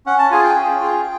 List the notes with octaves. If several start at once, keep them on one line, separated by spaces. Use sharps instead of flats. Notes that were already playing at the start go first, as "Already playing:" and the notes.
C#4 F#5
A5
F4 G#4 G#5
G5
C#4
F4 G#4